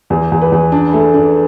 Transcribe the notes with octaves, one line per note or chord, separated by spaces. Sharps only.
E2
E2
B4
E2
D4
A3
D4